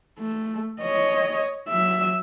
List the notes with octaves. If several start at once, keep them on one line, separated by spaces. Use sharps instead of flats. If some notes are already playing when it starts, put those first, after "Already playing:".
A3
C#5 D#5
F#3 E5